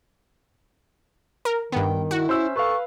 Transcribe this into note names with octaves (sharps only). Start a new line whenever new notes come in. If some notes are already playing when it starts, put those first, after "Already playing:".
A#4
G2 D#3 B3 G5
E4 F#4
C#4 C5 E5 E6
A4 B4 F5 C#6